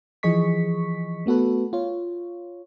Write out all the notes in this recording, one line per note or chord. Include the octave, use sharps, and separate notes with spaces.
E3 F3 G#4 D#5 C#6 B6
A3 B3 F#4 A4 B4
F4 C#5